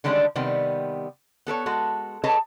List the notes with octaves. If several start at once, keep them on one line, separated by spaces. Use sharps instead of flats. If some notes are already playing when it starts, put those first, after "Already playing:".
D3 D#3 G3 G#3 C#4 D4
C3 D#3 G3 B3
B3 A4 A#4 C#5
G#3 F#4 A4
G#4 A4 B4 C#5 D#5 A5